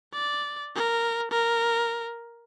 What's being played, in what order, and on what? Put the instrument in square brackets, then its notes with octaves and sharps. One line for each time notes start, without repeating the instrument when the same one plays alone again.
[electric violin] D5
A#4
A#4